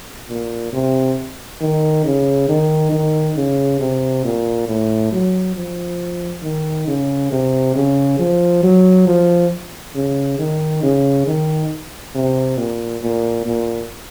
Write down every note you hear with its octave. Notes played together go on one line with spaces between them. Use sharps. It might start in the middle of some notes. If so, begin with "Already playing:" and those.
A#2
C3
D#3
C#3
D#3
D#3
C#3
C3
A#2
A2
F#3
F3
D#3
C#3
C3
C#3
F3
F#3
F3
C#3
D#3
C#3
D#3
C3
A#2
A#2
A#2